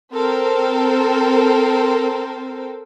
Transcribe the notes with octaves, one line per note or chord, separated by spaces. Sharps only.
C4 A4 A#4 C5